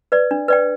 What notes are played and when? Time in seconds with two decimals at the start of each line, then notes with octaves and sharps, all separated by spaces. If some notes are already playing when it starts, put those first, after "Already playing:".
0.12 B4 D5
0.31 D4
0.48 B4 D5 G5